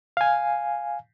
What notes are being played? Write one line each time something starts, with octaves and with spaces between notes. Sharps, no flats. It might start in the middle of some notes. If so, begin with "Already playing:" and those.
F5 G#5